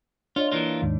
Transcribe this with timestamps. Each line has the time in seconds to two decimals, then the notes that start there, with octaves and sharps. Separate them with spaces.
0.36 D4 F4 C#5 D#5
0.52 E3 A#3 F4
0.82 D#2 G#2 D#3